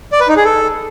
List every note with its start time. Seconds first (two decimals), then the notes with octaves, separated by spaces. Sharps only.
0.12 D5
0.20 B4
0.28 D#4
0.37 G#4
0.45 A4